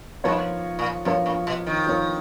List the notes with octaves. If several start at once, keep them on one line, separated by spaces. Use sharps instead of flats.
G#2 F3 B3 F4 A#4 C#5
A#2
F#2 F3 B3 F4 A#4 C#5
A#2
B2
D#3
F3 B3 F4 A#4 C#5